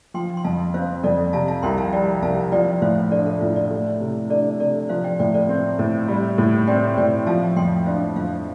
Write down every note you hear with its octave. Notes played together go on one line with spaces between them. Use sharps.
F3 G5 C6
C6
F2 F5 A5
C4 C5 F5
F2 A4 D5
C3 F5 A5
F5 A5
C2 G5 C6
F5 A5
G3 D5 G5
C2 F5 A5
F3 D5 G5
A2 C5 F5
D4 A4 D5
A4
A2 F4
A4 D5
A3
C3
D4 A4 D5
C3 A4 D5
F3 C5 F5
D5 G5
A2 D5 G5
A4 D5
C4
A2
G3
A2
C4 D5 G5
A2 D5 G5
F3 F5 A5
F2 G5 C6
D4 C5 F5
F2 C5 F5